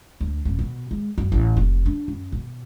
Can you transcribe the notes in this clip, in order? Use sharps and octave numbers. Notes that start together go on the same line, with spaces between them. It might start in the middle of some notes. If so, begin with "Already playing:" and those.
D2
D#1
B2
G#3
F#2
A1
F1
D4
F#2
B2